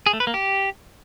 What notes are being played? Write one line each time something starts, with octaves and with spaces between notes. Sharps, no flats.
G#4
A3
B4
A#3
G4